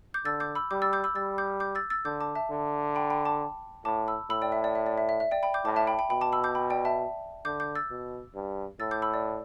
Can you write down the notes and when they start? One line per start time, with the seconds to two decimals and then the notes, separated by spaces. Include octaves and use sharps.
0.14 D6 G6
0.25 D3 E6 A6
0.40 D6 G6
0.55 B5 E6
0.71 G3 D6 G6
0.82 E6 A6
0.93 D6 G6
1.04 B5 E6
1.15 G3 E6 A6
1.38 D6 G6
1.60 D6 G6
1.75 E6 A6
1.90 E6 A6
2.05 D3 D6 G6
2.21 A5 D6
2.35 E5 A5
2.50 D3
2.95 G5 B5
3.10 G5 B5
3.25 A5 D6
3.85 A2 A5 D6
4.07 B5 E6
4.30 A2 B5 E6
4.42 D5 G5
4.52 E5
4.64 D5
4.75 E5
4.86 D5
4.98 E5
5.09 E5
5.20 E5
5.31 D5 G5
5.43 G5 B5
5.54 D6 G6
5.65 A2 A5 D6
5.76 E5 A5
5.87 G5 B5
5.99 G5 B5
6.10 B2 G5 B5
6.21 A5 D6
6.32 B5 E6
6.44 D6 G6
6.55 G5 B5
6.70 D5 G5
6.85 E5 A5
7.45 D3 D6 G6
7.60 D6 G6
7.75 E6 A6
7.90 B2
8.35 G2
8.80 A2 E6 A6
8.91 D6 G6
9.02 B5 E6
9.14 D5